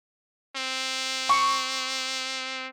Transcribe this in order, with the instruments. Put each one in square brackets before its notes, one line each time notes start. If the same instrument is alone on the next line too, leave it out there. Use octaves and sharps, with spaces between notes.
[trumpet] C4
[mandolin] C#6